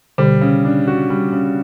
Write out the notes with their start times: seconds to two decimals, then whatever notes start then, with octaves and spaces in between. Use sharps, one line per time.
0.18 B2 D3 G3
0.41 C#3
0.65 D4
0.88 F#4
1.10 G3
1.33 C#3